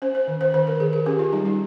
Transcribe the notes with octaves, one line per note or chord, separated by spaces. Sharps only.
C#4 C5
C5
D#3
C5
D#3 C5
A#4
D#3 G#4
G#4
C#4 G4
F4
G3 D#4
F4